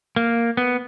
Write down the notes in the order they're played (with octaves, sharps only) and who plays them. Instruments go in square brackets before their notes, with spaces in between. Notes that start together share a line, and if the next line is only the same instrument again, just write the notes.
[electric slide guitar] A#3
B3